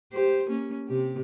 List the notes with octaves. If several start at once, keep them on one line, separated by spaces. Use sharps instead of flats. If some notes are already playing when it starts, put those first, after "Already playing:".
G4 C5
A#3 C#4
C3 G4